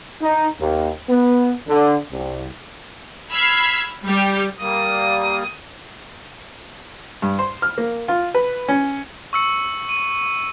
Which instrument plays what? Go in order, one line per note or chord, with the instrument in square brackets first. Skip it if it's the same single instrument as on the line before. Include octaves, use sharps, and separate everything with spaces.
[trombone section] D#4
D#2
B3
D3
C2
[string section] B5 E6 F6 G#6 B6 C7
G3 G4
[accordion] G3 A#3 [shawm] D#6
[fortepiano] G2
C5
F6
A#3
F4
B4
C#4
[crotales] C#6 E6 C#7
D#7